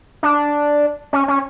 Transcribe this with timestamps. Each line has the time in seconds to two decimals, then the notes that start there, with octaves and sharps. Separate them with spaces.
0.23 D4
1.13 C#4
1.28 C#4